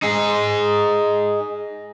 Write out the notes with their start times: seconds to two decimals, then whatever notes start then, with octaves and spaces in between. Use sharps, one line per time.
0.02 D#4 G#4